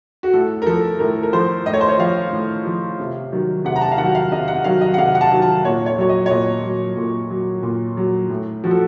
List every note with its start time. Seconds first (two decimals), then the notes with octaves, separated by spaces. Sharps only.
0.23 F#4
0.33 A2 A4
0.62 A#4
0.66 F3 A4
0.99 A2 A#4
1.23 A#4
1.33 F3 C5
1.66 A2 D#5
1.73 C#5
1.81 C5
1.88 C#5
1.99 F3 F5
2.32 A2
2.66 F3
2.99 C3
3.32 D#3 F#3
3.65 C3 F#5
3.76 A#5
3.81 A5
3.92 F5
3.98 D#3 F#3 F#5
4.15 F5
4.32 C3 D#5
4.48 F#5
4.64 D#3 F#3 F5
4.81 D#5
4.94 F#5
4.98 C3 F5
5.15 F#5
5.21 A5
5.31 D#3 F#3
5.42 A5
5.65 A#2 C#5
5.86 C#5
5.98 F#3 C#5
6.09 D#5
6.26 C#5
6.31 A#2 D#5
6.64 F#3
6.97 A#2
7.30 F#3
7.63 A#2
7.97 F#3
8.30 A2
8.64 F3 F#4
8.71 A4